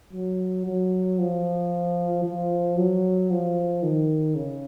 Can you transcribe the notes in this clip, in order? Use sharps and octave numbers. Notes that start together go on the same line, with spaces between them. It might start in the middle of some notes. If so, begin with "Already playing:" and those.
F#3
F#3
F3
F3
F#3
F3
D#3
C#3